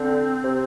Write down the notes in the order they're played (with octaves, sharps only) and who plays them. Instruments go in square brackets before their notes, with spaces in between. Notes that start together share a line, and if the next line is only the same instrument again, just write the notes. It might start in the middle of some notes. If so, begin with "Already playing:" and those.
Already playing: [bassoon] D3 [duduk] C4
[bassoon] C3